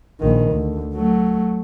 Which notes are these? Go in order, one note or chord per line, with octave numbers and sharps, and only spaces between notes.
A#1 D#3
D2
F#3 A3